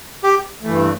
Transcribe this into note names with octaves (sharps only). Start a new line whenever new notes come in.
G4
G2 E3 A3